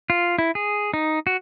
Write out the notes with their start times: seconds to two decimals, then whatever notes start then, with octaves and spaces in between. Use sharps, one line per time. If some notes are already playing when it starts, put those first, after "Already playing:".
0.10 F4
0.39 E4
0.55 G#4
0.94 D#4
1.27 F#4